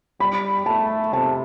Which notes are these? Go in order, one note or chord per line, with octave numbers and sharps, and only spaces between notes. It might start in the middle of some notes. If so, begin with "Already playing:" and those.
G3 B5
A3 A5
C3 A5